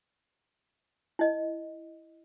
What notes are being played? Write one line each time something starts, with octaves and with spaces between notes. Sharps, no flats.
E4 D#5